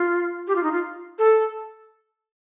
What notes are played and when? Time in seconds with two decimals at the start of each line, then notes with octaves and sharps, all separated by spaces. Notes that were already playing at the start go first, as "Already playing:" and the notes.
Already playing: F4
0.48 G4
0.55 F4
0.63 D#4
0.72 F4
1.19 A4